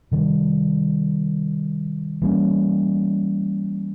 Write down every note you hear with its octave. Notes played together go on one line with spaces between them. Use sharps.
C3 D#3 G3
E3 G3 A#3 C#4